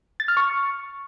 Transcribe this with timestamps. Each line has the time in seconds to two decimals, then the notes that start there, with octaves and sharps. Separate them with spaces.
0.20 A6
0.28 F6
0.37 C#6